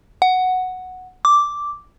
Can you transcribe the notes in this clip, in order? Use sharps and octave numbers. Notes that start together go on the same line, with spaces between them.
F#5
D6